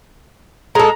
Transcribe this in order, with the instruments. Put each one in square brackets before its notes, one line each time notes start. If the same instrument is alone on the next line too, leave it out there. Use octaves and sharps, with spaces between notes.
[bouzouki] G#3 A4 [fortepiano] A#5